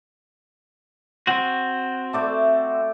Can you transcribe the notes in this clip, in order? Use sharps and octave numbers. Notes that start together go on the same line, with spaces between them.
C4 F#4
A3 D5 E5